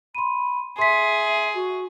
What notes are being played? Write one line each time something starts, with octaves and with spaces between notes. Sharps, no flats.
B5 C6 D#7
G#4 E5 C6 B6
F#4